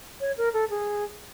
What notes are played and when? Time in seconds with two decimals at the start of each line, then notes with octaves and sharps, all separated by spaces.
0.21 C#5
0.38 A#4
0.54 A4
0.70 G#4